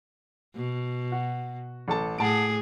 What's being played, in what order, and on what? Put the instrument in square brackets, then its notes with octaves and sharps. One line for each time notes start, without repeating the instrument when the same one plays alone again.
[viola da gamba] B2
[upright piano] F#4
A1 A4 A5
[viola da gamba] A2 G#4 [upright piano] F#5 A5 D7